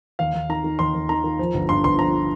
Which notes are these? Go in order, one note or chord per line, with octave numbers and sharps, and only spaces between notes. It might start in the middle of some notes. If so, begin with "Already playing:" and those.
D#2 F5
D#2
D#3 A#5
D#3
D#2 C6
D#2
D#3 A#5
D#3
F3
G1
G2 C6
G1 C6
F3 A#5